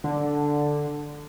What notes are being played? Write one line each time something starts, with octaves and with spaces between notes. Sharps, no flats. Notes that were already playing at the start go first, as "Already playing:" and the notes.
D3